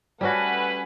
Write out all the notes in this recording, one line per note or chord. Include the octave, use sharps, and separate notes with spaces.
G3 A3 C#4 F#4 B4 F#5 G#5